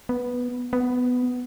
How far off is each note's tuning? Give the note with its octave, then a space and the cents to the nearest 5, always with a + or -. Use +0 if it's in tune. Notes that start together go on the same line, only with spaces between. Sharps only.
B3 -5
B3 +10